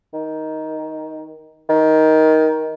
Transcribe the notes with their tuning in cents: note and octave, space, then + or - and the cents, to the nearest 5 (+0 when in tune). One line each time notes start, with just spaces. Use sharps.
D#3 +10
D#3 +15